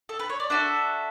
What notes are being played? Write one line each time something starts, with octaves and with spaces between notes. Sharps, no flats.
A4
B4
C#5
D5
D4 F#4 A4 E5